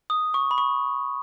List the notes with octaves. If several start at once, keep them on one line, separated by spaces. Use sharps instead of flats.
D#6
C#6
B5
C#6